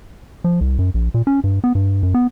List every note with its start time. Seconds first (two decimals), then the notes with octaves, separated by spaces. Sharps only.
0.44 F3
0.61 C2
0.79 F#2
0.94 A#1
1.14 A#2
1.27 C#4
1.44 G2
1.64 B3
1.75 G2
2.03 F#2
2.14 B3